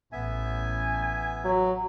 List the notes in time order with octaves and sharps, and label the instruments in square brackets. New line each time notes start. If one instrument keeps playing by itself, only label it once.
[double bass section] A1 [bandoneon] B3 E5 [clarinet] G#5
[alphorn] F#3